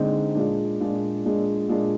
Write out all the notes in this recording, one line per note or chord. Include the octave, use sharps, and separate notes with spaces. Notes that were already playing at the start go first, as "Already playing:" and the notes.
Already playing: D3 G#3 C4 D#4
A#2 G#3 D4
A#2 G#3 D4
A#2 G#3 D4
A#2 G#3 D4